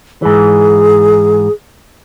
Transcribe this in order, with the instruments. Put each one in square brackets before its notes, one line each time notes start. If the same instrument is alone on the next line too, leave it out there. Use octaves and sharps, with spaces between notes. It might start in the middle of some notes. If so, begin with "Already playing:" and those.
[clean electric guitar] G#2 E3 [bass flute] G#4